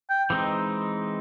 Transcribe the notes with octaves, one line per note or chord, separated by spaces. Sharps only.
G5
E3 G#3 C4 D#4